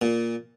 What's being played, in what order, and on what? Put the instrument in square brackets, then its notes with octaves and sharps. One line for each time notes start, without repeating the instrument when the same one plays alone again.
[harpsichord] A#2